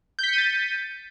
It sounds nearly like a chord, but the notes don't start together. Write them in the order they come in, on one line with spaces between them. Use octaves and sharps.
G6 B6 C#7 D#7 A6